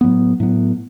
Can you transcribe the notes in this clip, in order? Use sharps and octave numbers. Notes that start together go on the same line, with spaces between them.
A2 F#3 B3
A2 F#3 B3